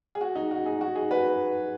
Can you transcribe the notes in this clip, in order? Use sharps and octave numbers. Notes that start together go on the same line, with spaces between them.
G#4
F#4
D#4
F#4
D#4 G#4
F#4
D#4 G#4
F#4 B4